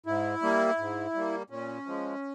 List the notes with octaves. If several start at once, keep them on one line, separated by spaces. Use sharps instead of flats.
G#2 E4
G3 A#3
G#2
G3 A#3
A#2 C#4
F3 G#3